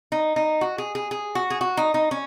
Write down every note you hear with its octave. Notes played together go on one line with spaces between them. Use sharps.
D#4
D#4
F#4
G#4
G#4
G#4
F#4
G#4
F#4
D#4
D#4
C#4